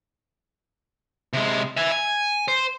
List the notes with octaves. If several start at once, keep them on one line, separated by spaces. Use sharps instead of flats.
C3 G#3
E5 G#5
G#5
C5